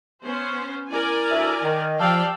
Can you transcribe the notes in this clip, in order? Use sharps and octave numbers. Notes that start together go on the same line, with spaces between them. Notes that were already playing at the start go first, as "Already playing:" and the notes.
B3 C#4 C5
E4 A#4 D5 G#5
D2 E5
D#3
F3 G3 D5 F5 G5 A5 E6